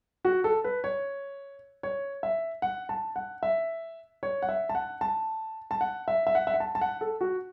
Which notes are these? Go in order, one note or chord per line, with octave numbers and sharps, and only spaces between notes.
F#4
A4
B4
C#5
C#5
E5
F#5
A5
F#5
E5
C#5
F#5
E5
A5
F#5
A5
A5
F#5
E5
E5
F#5
E5
F#5
A5
A5
F#5
A4
F#4